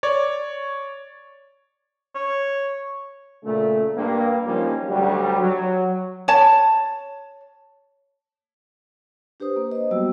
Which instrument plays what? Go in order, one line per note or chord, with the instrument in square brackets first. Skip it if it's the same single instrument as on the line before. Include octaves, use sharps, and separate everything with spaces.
[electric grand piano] C#5 D5
[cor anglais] C#5
[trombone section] A#2 C#3 A3
G2 A#3
D#3 F3 G3 A#3 C#4
D2 F#3 G3
F#3
[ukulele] C#5 A5
[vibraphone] D4 G4 B4 C5 D#6
A#3
C5 D#5
F#3 G3 A#3 B3 F#4 E6